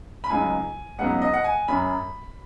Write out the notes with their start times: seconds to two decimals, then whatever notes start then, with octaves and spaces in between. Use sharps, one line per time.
0.24 B5
0.30 C#2 C#3 F#3 D#4 G#5
0.99 C#2 C#3 F#3 B3 D#4 F#5
1.22 D#5
1.34 F#5
1.44 G#5
1.68 F#2 F#3 C#4 B5